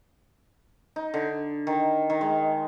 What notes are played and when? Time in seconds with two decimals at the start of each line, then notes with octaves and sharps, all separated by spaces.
0.96 D#4
1.14 D3
1.67 D#3
2.10 D#3
2.21 G#3